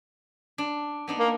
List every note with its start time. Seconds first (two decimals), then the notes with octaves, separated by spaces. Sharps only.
0.58 D4
1.08 B3 D4 D#4
1.19 A#3